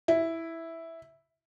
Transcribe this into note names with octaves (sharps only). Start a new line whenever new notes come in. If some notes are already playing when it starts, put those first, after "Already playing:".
E4